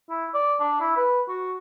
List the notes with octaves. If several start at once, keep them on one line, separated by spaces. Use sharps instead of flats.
E4
D5
D4
E4
B4
F#4